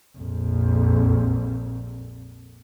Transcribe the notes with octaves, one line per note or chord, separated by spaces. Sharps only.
A#1 F2